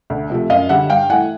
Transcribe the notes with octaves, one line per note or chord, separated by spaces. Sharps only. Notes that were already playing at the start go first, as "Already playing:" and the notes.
D2
C3 F3 A3
F#2 D#5 F5
D3 G3 E5 F#5
G2 F5 G5
E3 A3 F#5 G#5